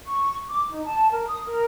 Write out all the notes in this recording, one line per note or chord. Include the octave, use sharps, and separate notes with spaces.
C#6
D6
D#4
A5
A#4
D#6
A#4